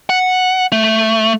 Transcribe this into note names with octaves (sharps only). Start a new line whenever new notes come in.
F#5
A3